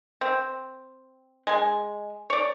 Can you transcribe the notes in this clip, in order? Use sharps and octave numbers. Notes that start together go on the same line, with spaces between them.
C4
G#3 G#5
C#5 D5